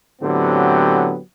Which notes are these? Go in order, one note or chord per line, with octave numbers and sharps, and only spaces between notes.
A2 D3 F#3 B3 C4 G4